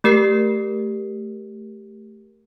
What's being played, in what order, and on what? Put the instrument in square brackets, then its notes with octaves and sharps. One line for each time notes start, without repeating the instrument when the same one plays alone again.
[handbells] A3 G4 A#4 C7